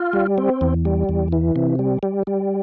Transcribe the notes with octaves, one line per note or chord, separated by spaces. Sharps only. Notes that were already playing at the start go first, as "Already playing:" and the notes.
Already playing: F4
G3
C4
E2
G3
E2
E3
C3
G3
G3
G3